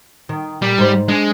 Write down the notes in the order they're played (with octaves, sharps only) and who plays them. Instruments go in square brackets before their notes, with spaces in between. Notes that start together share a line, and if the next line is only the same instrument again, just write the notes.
[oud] D#3
[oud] A#2 [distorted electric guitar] G3
[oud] G#2 C5
[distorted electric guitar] G#3 [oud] D4